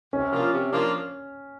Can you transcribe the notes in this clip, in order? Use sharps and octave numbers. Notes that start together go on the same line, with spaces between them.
C3 C#4
F3 A#3 D4 F4
C3
F3 A#3 D4 F4